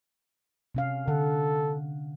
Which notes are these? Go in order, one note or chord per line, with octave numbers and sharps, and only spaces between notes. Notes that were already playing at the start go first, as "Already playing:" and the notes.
C3 C#4 F5
D3 A4 F#5